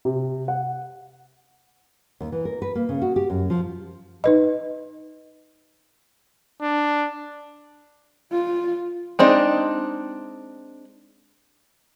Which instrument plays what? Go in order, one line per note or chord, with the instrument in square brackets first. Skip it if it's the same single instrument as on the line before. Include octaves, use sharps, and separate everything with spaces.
[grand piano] C3
F#5
[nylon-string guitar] D#2
E3
A#4
B4
A#3
C#3
F#4
G4
F#2
F3
[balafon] D#4 B4 D#5
[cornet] D4
[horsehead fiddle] F4
[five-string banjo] G#3 C4 D4 D#4